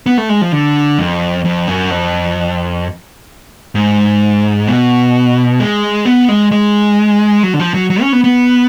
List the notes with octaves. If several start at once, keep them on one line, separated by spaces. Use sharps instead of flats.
B3
A3
G#3
F3
D3
F2
F2
F#2
F2
G#2
B2
G#3
B3
G#3
G#3
F#3
D3
F3
F#3
F#3
C#4
B3
B3